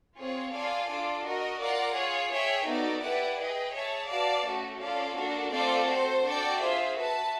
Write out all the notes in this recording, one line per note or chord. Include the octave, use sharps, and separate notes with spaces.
C4 F4 G#4 C#5
F4 A4 D5 F5 G#5
D4 F4 A4 D5
F#4 A#4 D#5
F4 A#4 D5 F#5
F4 G#4 C#5
G#4 C#5 E5 G5
B3 D#4 F#4 A4 D5
E4 G4 B4 D5 F#5
G#4 B4 D#5 G5
G#4 C#5 E5 A5
F#4 B4 D5 F5 A5
A3 C#4 F#4 A4
C#4 F4 A4 D5 F5
A#3 D4 F#4 A4
A3 C4 F4 A4 D5
F#4 A4 C5
D4 F#4 A4 D5 G5
F4 G#4 C5 E5
F#4 B4 E5 A5